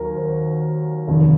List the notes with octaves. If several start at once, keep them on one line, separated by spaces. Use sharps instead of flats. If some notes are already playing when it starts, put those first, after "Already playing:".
Already playing: D#2 D#3 F#3 F#4 A#4
C5
F1 D#2 D#3